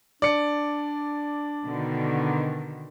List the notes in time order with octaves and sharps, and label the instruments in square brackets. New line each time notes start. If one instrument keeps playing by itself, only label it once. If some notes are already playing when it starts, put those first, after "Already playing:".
[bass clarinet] D4 [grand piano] D5 C#7
[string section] B2 D3 D#3